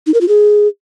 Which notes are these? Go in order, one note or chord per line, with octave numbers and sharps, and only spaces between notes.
D#4
A#4
F4
G#4